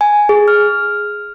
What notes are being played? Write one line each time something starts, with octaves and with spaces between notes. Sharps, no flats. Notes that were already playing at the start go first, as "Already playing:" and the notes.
G#5
G#4
F6